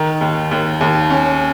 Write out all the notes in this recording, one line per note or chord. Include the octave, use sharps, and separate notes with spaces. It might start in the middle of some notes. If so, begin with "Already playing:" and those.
Already playing: D#3
D#2
D#2
D#2
C#4